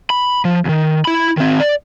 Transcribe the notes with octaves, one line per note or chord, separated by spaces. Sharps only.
B5
F3
D#2 D#3
E4 B5
D#3 C4
D5